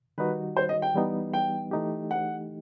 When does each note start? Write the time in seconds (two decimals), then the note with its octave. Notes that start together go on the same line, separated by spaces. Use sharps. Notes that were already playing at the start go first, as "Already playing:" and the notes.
0.18 D#3 G3 D#4 F#4 B4
0.57 C5
0.69 D#5
0.82 G5
0.94 E3 G3 B3 D#4
1.33 G5
1.71 E3 A3 D#4 G4
2.11 F#5